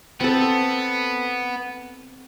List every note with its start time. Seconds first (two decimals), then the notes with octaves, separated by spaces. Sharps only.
0.21 B3 C4 A4